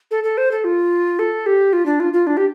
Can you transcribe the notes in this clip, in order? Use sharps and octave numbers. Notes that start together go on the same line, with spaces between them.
A4
A4
C5
A4
F4
A4
G4
F4
D4
F4
F4
D4
G4